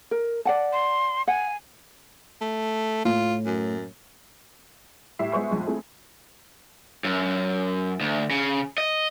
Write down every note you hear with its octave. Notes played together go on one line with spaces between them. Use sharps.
A#4
D5 F#5 A5
C6
F#5 G#5
A3
A2 F4
F#2
A2 E4 G4 E5 C7
G#3 B3 G#4 C5 E5 C#6
A#1 F2 G#3
A3 C4 E4 G#4
F#2
D2
C#3
D#5